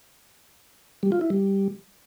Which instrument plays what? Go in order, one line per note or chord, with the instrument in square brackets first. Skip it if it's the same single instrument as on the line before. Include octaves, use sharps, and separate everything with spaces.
[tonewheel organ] G3
F4
E4
G3